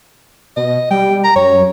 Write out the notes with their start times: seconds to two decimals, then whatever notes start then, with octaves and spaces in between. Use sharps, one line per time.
0.57 B2 D#5
0.91 G3 G5
1.24 A#5
1.36 F#2 C#5